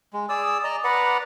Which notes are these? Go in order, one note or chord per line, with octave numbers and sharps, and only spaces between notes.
G#3
G#4 D5 D#6 E6
D5 D#5 A#5
B4 D5 F#5 A#5